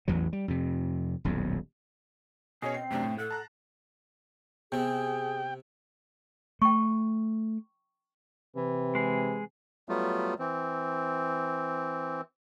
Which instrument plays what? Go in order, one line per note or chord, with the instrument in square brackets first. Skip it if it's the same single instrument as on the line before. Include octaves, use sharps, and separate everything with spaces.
[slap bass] A1 E2 E3 F#3
G3
F2 C3
D#1 B1 F2
[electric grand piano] B2 C#4 C#5 [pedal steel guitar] G#4 [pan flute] D#5
[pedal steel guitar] C4 [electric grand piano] C7
[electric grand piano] F#2 C3 D4 [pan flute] A3
[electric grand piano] A2
[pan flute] A4 [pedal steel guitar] F#5
[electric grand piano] A5 A#5 F#6
[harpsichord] C3 C4 [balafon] B3 G4 [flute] G#4 [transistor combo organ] G5
[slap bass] A3 [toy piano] G5 C#6
[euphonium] C3 [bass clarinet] E3
[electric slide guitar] G#3 G#4
[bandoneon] F#3 G3 A3 B3 F4
E3 C4